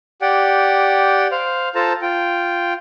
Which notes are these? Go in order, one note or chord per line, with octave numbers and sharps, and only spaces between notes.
G4 D5 F#5 G5
C5 F5
F4 A4 C5 A5 A#5
F4 G5